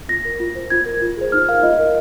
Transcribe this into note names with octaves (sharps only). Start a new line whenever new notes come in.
F4 A#6
A#4
F4
C5
F4 G#6
A#4
F4
G#4 C5
D#4 F6
A#4 F5
F4 D#5
A#4